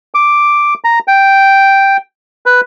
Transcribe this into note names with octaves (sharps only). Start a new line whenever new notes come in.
D6
A#5
G5
B4